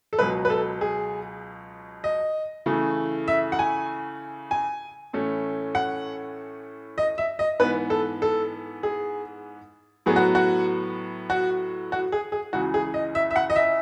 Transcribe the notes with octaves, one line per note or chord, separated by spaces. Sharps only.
A4
C#2 B2 F#3 B4
B4
A4
G#4
D#5
C#3 E3 A3
E5
F#5
G#5
G#5
A2 E3 A3 C#4
F#5
D#5
E5
D#5
G#2 E3 B3 B4
A4
A4
G#4
A2 F#3 B3 G#4
F#4
F#4
F#4
F#4
G#4
G#4
C#2 C#3 E3 F#4
G#4
D#5
E5
E5
F#5
D#5
E5